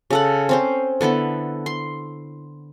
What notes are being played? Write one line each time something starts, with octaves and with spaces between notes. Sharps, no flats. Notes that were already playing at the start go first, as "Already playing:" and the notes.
C#3 A4 F#5
C4 C#4 C5
D3 B3 E4 A4
C6